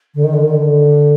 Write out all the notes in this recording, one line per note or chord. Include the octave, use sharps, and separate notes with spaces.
D3
D#3
D3
D#3
D3